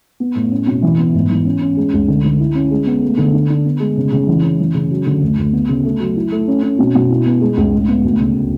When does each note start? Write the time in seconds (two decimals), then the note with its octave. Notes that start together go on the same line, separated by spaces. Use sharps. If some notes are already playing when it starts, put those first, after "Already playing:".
0.20 B3
0.35 A2
0.51 C#4
0.67 B2
0.82 E3
0.99 B3
1.14 G#2
1.30 E3
1.46 C#4
1.61 C#4
1.77 G#3
1.93 C#2
2.08 D3
2.24 D3
2.40 E4
2.55 C#4
2.71 G#3
2.87 B3
3.02 A3
3.17 D3
3.33 D4
3.50 D4
3.65 B3
3.80 G#3
3.97 C#3
4.12 C#3
4.27 E3
4.43 C#4
4.59 E3
4.74 C#3
4.91 F#3
5.06 D3
5.22 D2
5.38 D2
5.53 B3
5.69 C#3
5.85 A3
6.00 F#3
6.16 E4
6.32 A3
6.48 C#4
6.63 C#4
6.79 B2
6.95 B2
7.10 E4
7.26 B3
7.41 G#3
7.57 C#2
7.73 A2
7.88 B3
8.03 D2
8.19 C#3